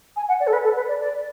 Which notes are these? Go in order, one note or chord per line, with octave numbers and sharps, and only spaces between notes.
G#5
F#5
D5
A4
B4
A4
B4
D5
D5